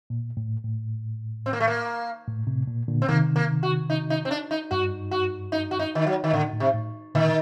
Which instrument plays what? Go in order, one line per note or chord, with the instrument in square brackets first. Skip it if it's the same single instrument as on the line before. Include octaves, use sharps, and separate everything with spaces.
[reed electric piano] A#2
A2
A2
[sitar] C4
A#3
A3
A#3
[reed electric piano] A2
A2 C3
A#2
A#2 D3
[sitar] C4
[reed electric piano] C3 D#3 [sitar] A#3
[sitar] A#3
F#4
D#4
D#4
C4
D4
D#4
[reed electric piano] G2 [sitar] F#4
[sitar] F#4
D#4
F#4
D#4
D#3
F#3
D#3
[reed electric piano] A2 [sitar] D3
[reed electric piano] A2
[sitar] C3
[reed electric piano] A2
[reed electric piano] A#2 D3 [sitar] D#3